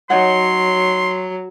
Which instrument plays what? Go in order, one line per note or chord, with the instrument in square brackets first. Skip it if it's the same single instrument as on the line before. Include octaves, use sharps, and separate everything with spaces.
[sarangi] F#3 [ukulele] D#4 C#5 F#5 [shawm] C6